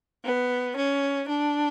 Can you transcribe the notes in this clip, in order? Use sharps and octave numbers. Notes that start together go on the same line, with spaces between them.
B3
C#4
D4